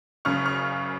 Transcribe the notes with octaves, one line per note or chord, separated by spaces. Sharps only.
F#1 F#2 C#3 C#6 F6
C#6 F6